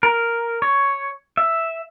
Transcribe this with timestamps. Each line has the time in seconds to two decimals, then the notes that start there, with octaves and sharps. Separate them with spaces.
0.03 A#4
0.62 C#5
1.37 E5